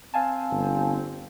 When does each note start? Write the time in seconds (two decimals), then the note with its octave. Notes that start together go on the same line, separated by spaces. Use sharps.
0.14 C4 F5 G#5 A5
0.51 G1